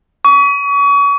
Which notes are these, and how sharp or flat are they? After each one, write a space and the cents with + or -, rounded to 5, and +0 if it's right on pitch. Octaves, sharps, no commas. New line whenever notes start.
C#6 +35